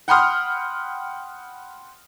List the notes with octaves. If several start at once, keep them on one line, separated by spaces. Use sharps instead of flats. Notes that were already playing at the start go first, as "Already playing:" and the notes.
F#5 G5 B5 C6 D#6 F6